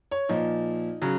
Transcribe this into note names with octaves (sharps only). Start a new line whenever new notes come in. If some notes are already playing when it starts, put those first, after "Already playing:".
C#5
A#2 F3 D#4
C#3 F#3